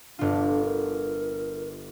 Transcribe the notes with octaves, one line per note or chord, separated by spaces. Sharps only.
G1 D4 F4
A#4